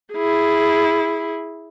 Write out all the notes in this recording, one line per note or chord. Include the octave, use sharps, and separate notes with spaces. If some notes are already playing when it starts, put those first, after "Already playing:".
E4 G#4